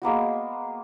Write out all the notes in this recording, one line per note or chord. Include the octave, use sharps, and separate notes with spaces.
G#3 A#3 B3 F#4